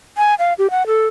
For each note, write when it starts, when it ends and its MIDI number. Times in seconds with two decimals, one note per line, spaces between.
0.17 0.35 80
0.39 0.53 77
0.59 0.70 67
0.71 0.87 78
0.87 1.07 69